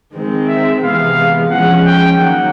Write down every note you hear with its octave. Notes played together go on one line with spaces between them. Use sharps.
D#3 G#3 C4
E5
C3 E3 G#3 B3 F5
F3 G#3 C#4 F#5
G5
D#3 F#3 A#3 F#5